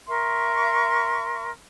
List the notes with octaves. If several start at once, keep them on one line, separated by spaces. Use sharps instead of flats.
A#4 E5 C6 C#6